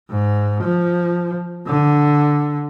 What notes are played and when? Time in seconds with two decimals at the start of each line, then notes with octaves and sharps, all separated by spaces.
0.10 G#2
0.64 F3
1.67 D3